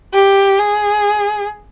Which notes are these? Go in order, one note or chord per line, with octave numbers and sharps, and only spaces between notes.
G4
G#4